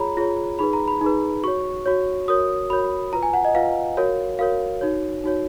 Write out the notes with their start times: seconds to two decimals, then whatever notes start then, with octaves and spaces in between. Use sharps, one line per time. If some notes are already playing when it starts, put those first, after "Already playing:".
Already playing: F4 G#4 C#5 A#5 B5
0.17 F4 G#4 C#5
0.59 D#4 G#4 B4 B5
0.73 A#5
0.88 B5
1.01 D#4 G#4 B4
1.44 F#4 C#5 C#6
1.86 F#4 C#5
2.28 F#4 A#4 C#5 D#6
2.70 F#4 A#4 C#5 B5
3.13 F4 B4 A#5
3.23 G#5
3.33 F#5
3.45 D#5
3.55 F4 B4 F5
3.97 F#4 A#4 C#5
4.39 F#4 A#4 C#5 F5
4.81 D#4 F#4 C#5
5.24 D#4 F#4 C#5